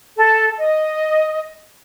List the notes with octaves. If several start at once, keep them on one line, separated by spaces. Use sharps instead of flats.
A4
D#5